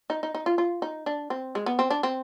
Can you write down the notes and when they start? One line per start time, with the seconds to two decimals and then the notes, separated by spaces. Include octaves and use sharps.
0.10 D#4
0.23 D#4
0.35 D#4
0.46 F4
0.58 F4
0.82 D#4
1.06 D4
1.30 C4
1.55 G#3
1.66 B3
1.79 C4
1.91 D4
2.03 C4